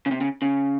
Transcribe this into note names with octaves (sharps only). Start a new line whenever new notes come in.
C#3
C3
C#3
C#3